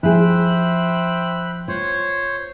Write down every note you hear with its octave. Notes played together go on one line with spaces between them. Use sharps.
F3 E4 G#4 C5 E5 G5 B5 F#6
F4 C5 C#5